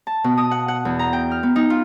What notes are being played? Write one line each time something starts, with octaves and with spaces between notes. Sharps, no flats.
A5
B2
D#6
F#5
F#5
E2
A#5
G5
F6
B3
D#4
F4